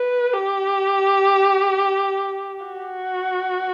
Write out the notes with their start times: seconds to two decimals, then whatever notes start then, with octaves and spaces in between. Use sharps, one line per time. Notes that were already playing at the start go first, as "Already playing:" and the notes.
Already playing: B4
0.34 G4
2.66 F#4